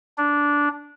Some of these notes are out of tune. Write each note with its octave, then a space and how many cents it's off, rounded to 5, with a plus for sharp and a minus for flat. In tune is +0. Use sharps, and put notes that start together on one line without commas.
D4 -10